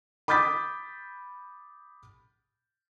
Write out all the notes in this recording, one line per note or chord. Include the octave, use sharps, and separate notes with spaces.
B5 D6 D#6 G6 A6 B6